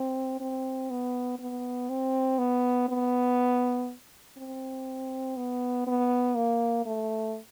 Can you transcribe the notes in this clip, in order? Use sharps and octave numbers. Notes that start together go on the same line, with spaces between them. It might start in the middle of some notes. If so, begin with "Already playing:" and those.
Already playing: C4
C4
B3
B3
C4
B3
B3
C4
B3
B3
A#3
A3